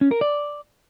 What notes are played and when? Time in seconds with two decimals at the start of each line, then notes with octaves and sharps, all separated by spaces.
0.01 C#4
0.11 A#4
0.21 D5